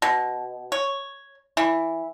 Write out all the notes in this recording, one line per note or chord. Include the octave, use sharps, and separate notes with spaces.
B2
C#5
E3